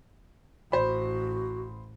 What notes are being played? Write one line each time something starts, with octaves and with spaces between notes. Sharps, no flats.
A1 F#4 C5 B5